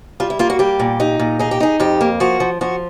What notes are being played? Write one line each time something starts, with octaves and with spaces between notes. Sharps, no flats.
G3 F4
E4
A#3 F4
F#4
G3 G4
A#2
D#4
A#2
D#4 G#4
G4
D#4 G#4
F2 G4
A#3
F3 F#4
F3
F3 F#4